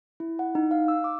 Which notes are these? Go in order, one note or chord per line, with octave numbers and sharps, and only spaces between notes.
E4
F#5
D#4
F5
E6
D6